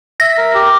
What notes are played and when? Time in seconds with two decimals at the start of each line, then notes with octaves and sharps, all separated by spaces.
0.20 E5 A#6
0.38 A#4
0.55 G4